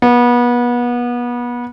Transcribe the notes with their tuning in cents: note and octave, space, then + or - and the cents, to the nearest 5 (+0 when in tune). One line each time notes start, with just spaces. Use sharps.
B3 -30